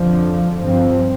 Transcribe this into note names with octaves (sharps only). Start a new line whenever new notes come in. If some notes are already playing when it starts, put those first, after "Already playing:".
Already playing: F2 D3 F3
G2 F3 C4